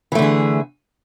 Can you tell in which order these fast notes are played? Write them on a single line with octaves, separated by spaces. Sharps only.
E3 A3 D3 G#4